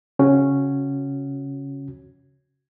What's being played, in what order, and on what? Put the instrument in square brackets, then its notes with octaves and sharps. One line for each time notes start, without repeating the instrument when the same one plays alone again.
[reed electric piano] C#3 C#4 F#4